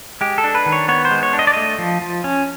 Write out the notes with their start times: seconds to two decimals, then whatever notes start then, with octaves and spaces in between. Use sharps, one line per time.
0.21 G#3 G4
0.38 A4
0.44 D4
0.55 B4
0.66 D#3
0.72 C#5
0.88 B3 C#5
1.05 C5
1.11 G#3
1.23 C#5
1.33 D4
1.39 D#5
1.47 D5
1.54 A3 D#5
1.78 F3
2.02 F3
2.24 C#4